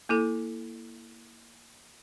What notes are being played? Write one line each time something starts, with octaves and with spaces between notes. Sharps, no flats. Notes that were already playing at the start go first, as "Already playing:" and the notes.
A#3 E4 A4